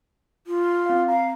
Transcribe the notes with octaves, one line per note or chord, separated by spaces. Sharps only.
F4
C4 F5
F5 A#5